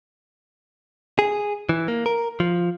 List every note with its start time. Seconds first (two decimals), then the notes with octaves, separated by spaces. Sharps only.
1.19 G#4
1.69 E3
1.88 A#3
2.06 A#4
2.40 F3